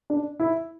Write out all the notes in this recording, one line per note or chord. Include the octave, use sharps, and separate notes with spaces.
D4
E4